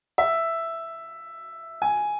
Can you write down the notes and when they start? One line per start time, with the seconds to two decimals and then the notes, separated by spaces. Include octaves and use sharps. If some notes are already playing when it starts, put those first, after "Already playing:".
0.18 E5
1.82 G#5